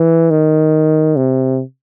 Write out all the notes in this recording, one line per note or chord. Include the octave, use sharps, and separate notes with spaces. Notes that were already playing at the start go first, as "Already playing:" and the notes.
Already playing: E3
D#3
C3